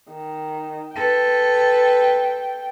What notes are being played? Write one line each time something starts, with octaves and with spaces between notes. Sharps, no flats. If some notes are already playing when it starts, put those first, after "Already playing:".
D#3
A4 B4 G5